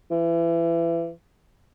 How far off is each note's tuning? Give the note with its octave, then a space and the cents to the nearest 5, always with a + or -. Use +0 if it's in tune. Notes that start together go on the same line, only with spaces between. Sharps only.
E3 +30